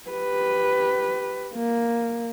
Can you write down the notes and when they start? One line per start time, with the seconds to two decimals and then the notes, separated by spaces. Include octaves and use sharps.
0.10 G4 B4
1.55 A#3